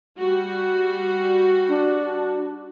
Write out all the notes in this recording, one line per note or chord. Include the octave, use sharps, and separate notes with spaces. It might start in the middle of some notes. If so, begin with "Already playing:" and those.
G3 F#4
D4